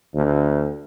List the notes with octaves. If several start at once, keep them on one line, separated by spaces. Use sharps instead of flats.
D2